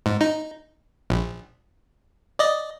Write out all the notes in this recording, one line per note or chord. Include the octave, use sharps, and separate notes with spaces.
G#2
D#4
A#1
D5 D#5